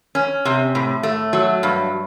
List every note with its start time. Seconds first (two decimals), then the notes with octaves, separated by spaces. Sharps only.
0.15 C#4
0.45 C3
0.75 A2
1.03 A3
1.33 F#3
1.63 G2